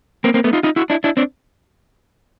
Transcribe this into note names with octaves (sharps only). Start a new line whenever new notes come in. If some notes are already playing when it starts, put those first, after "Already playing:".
A#3 C4
A#3 C4
A3 B3
D#4 F4
D#4 F4
E4 F#4
D4 E4
D4 E4
C4 D4